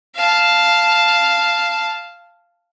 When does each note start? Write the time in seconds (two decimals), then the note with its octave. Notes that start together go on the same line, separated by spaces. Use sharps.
0.15 F5 A5